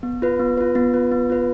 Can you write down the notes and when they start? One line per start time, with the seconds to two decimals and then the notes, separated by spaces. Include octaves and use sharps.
0.03 B3
0.22 F4 B4
0.40 B3
0.58 F4 B4
0.75 B3
0.93 F4 B4
1.12 B3
1.30 F4 B4